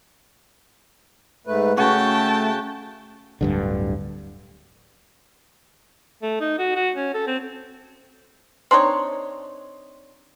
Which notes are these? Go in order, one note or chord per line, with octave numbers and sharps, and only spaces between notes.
G#2 A3 B4
C#3 A3 F#4 G5 A5 C#6
D1 G2 D3
A3
D#4
F#4
F#4
C#4
A4
C4
C4 D4 D#4 C#5